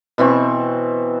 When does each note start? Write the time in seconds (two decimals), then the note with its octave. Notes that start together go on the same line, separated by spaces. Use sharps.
0.18 B2 E3 C4 C#6